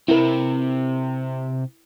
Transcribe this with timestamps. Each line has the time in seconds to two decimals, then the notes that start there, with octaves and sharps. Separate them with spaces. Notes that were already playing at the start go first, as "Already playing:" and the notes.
0.08 C3 C4 E4 A#4